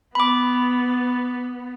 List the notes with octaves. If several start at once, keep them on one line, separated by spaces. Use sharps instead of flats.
B3 B5 D6